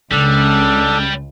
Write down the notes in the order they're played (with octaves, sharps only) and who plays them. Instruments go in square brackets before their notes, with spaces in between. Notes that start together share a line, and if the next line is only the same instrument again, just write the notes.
[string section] C#2 [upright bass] C#3 [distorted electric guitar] G3 [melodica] D4 A4